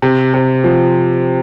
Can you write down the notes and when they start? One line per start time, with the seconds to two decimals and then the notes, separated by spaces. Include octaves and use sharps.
0.02 C3
0.34 C3
0.64 F3